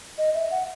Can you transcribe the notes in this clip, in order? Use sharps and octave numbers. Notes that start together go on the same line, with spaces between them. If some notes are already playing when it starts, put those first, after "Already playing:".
D#5
E5
F#5